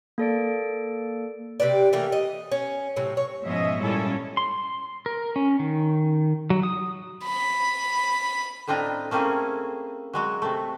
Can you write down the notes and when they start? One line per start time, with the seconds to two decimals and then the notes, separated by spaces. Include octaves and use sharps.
0.18 A#3 A4 D5 D7
1.60 C3 G4 B4 D5
1.93 E3 A3 A#3 G4
2.12 D#5
2.52 C#4
2.96 A2 C3 F#3
3.17 C#5
3.43 G#2 B2 F3 C#4 D#5 E5
3.80 A#2 G3 C#4 E4 A4
4.37 C6
5.06 A#4
5.36 C#4
5.59 D#3
6.50 F#3
6.63 D#6
7.25 B5
8.68 A2 C4 D4 F4 D#5 A#5
9.11 A3 A#3 C4 C#4 E4 G#4
10.13 F#3 G#3 F#4
10.42 C3 A3